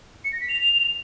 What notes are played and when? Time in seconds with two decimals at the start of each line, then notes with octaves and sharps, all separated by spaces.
0.24 C#7
0.32 A#6
0.40 B6
0.49 F7